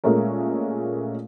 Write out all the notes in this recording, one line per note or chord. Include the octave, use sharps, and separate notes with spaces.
A#2 G#3 A3 C#4 A#4